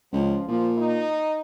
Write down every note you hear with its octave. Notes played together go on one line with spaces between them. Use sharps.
C#2 F3
A#2 F3
D#4